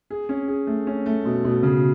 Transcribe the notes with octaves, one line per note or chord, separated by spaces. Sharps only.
G#4
C#4
G#4
A3
C#4
A3
B2
B2
C#3